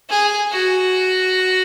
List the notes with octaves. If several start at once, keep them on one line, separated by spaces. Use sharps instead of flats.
G#4
F#4